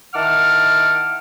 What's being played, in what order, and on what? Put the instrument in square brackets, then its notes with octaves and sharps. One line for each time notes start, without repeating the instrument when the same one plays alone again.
[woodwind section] D#3 E4 F#5 A5 D6 F6